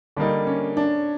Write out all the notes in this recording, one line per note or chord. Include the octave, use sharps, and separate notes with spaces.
D3 G3 A#3 D4 D#4
C#4
D4